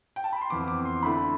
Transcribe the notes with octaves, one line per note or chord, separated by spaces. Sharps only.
G5
A5
B5
C6
F2 E3 B3 D6
D6
C6
D3 A3 E4 B5